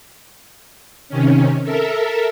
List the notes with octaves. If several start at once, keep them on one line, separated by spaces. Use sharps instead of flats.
C3 D#3 C#4
A4 A#4 E5